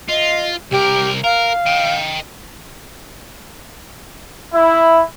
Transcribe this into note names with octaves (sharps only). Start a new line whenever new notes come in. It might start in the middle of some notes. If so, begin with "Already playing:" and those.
F4 D#5
C2 G4 A#4
A#4 F5
D#5 G5
E4